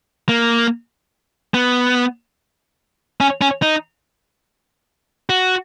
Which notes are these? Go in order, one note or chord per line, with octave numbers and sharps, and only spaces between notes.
A#3
B3
C#4
C#4
D#4
F#4